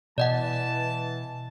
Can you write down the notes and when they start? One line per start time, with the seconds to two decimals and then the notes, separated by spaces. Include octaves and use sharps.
0.18 B2 E3 D5 D#5 F#5 A5